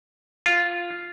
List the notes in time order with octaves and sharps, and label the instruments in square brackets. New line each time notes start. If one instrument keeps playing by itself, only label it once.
[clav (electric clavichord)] F4